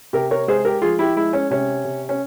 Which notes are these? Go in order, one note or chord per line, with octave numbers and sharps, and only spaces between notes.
C3 G4 A#4
A#4 C#5
G#3 G#4 C5
G4 A#4
F3 F4 G#4
E4 G4
G#3 E4
C#4
C3 C#4
C3
C#4